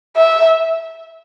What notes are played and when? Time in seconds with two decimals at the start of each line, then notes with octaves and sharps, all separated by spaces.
0.17 E5